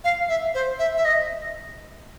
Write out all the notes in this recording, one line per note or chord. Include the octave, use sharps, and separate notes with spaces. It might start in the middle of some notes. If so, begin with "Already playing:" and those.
F5
E5
C5
E5
E5
D#5